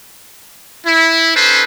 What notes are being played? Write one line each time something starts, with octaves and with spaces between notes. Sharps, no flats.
E4
C#4 D#4 A4 B4 C5